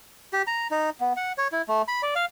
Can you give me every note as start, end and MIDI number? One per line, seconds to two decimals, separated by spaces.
0.33 0.42 67
0.47 0.67 82
0.71 0.90 63
1.00 1.13 59
1.16 1.32 78
1.38 1.48 73
1.52 1.62 64
1.68 1.82 57
1.88 2.02 83
2.03 2.14 74
2.15 2.25 77